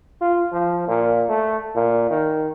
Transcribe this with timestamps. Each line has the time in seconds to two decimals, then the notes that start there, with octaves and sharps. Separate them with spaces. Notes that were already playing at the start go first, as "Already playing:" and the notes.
0.21 F4
0.52 F3
0.88 A#2
1.29 A3
1.75 A#2
2.10 D#3